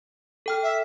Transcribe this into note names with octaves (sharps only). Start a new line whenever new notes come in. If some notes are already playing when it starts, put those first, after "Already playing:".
A4 G5 F6
E5